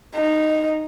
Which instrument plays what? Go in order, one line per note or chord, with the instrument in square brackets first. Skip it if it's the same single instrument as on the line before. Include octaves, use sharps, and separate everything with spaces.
[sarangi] D#4